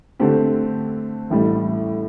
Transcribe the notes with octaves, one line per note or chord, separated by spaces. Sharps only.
D3 A3 C4 G4
A1 A2 G3